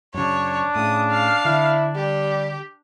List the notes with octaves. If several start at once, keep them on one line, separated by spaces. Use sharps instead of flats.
F#2 C#3 D4 C#5
A2 C#3 D#6
F5
D3 E4
G3 G4